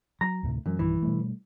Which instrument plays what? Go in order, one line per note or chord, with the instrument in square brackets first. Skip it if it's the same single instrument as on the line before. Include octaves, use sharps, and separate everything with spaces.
[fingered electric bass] F#3 [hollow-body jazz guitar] A#5
[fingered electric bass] D2 A2 C3
[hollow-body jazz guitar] F#2 [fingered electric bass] E3 G#3
[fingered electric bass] B1 G2 D#3 [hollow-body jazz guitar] E3
[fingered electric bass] B2 G3 A3